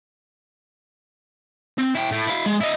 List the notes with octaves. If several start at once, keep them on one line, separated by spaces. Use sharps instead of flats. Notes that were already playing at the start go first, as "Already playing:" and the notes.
C4
E4 G5
A2
E4 F5
G#3
E4 D#5